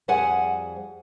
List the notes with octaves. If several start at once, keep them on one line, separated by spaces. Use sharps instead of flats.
F2 G3 G#4 C5 F#5 G#5